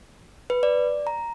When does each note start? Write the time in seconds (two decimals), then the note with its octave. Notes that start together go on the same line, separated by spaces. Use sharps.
0.50 B4
0.63 D5
1.07 A#5